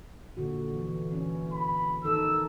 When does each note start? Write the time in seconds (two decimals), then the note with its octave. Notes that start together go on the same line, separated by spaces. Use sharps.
0.37 A#2 D3 F#4
0.74 E3
1.11 E3 C#4
1.53 B5
2.05 D#3 D#4 A4 E6